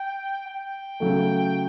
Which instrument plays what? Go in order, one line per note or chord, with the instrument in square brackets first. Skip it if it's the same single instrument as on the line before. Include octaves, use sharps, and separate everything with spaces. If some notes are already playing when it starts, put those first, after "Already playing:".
Already playing: [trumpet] G5
G5
[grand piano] C#3 F#3 A3